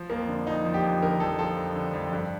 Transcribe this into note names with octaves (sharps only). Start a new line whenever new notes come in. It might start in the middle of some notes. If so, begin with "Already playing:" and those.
Already playing: F3
F2 A#3
D3
F2 D#4
F3
G4
F2
D3 A#4
F2 A4
F3 A4
F2
D3
F2
G2